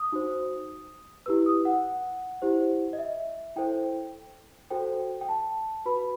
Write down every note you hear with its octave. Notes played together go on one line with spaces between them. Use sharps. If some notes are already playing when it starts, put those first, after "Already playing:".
Already playing: D#6
D#4 F#4 C5
E4 G4 B4 E6
D#6
F#5
E4 G4 C5
D#5
E5
E4 A4 C5 G5
F#4 A4 C5 G5
G5
A5
F#4 B4 B5